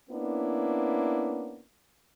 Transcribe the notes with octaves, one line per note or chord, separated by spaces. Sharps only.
A#3 B3 C#4 D4 E4